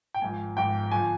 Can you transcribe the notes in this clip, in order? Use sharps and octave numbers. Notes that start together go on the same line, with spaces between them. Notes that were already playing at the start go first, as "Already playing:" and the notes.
G5
G#1 G#2 F3 G#5
G#1 G#2 F3 G5
G1 F3 G#5